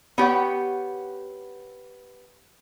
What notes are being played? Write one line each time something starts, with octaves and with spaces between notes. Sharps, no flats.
B3 G4 C#5 F#5